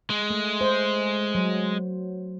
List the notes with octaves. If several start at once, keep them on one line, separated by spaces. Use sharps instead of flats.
G#3
A3
C5
F#3